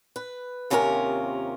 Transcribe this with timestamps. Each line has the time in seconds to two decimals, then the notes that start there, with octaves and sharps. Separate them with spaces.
0.16 B4
0.70 D#2 C3 C#4 E4 F4 A#4